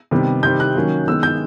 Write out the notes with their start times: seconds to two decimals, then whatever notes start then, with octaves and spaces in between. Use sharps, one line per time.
0.11 C3 D#3 G3 B3
0.43 C3 D#3 G3 C4 G6
0.60 F#6
0.75 D#3 F#3 A#3 C#4
1.07 D#3 G#3 B3 E6
1.23 G6